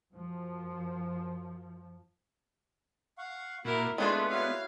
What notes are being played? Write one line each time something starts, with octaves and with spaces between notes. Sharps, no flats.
F#2 F3
F5 F#5 C#6
A#2 A#3 E4 F#4 A#4
G#3 A3 B3 D4 E4 F4 G#4
E4 F#4 C#5 F5